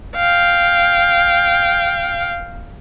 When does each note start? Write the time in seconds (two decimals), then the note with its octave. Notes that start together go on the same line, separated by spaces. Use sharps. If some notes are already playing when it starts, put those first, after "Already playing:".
0.16 F5 G5